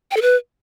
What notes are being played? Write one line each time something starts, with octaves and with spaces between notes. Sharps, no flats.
G5
A4
B4